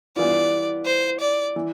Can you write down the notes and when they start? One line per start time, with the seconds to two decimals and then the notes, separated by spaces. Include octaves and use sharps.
0.16 G2 E3 B3 F4 D5
0.86 C5
1.20 D5
1.56 E3